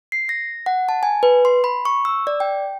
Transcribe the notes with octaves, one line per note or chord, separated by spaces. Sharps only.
C7
A#6
F#5
A5
G#5
B4
C6
B5
C#6
E6
D5
G5